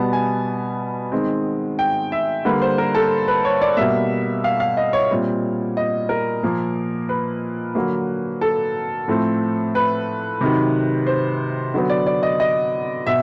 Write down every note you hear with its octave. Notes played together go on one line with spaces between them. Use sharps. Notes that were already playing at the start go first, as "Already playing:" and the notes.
Already playing: B2 G3 B3 A5
G#5
D#3 G#3 C4
G5
E5
D3 G3 A#3 B4
C5
A#4
A4
B4
C#5
D5
B2 G3 A#3 E5
F5
F5
D#5
C#5
A#2 G3 C4
D#5
A#4
A#2 F3 A#3
B4
D3 F#3 A#3
A4
A2 F3 A3 C4
B4
C3 D#3 F#3
C5
D3 F#3 B3
D5
D5
D#5
D#5
B2 E5